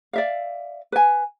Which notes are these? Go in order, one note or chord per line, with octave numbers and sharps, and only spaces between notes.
D5 E5 F5
B4 G#5